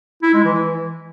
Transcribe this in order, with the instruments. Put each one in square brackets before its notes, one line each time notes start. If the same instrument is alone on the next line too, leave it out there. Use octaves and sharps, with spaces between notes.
[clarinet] E4
G#3
E3